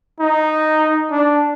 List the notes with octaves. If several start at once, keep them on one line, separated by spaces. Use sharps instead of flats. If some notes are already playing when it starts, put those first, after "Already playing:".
D#4
D4